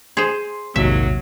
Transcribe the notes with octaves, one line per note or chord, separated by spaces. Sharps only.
G#4 C5 C6
A#1 D#2 G#2 C3 F#3 E5